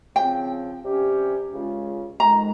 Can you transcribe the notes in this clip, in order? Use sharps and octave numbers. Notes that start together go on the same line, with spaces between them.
C#3 F3 C4 G5
C3 G3 C#4 G4
C#2 C#3 G#3 C#4 F4
F2 D#3 G#3 A#5